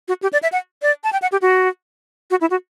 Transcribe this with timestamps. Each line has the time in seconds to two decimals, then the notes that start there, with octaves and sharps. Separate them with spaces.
0.08 F#4
0.23 G4
0.33 D5
0.43 E5
0.52 F#5
0.82 D5
1.04 A5
1.13 G5
1.22 F#5
1.32 G4
1.42 F#4
2.31 F#4
2.41 E4
2.50 F#4